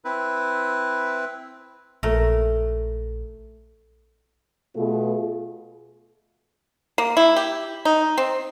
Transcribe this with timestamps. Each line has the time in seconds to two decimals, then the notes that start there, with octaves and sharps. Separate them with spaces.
0.05 C4 E4 B4
2.03 A#1 A3 A#4
4.76 B2 A3 B3 F4 G#4
6.98 A#3
7.17 E4
7.36 G4
7.85 D#4
8.18 C4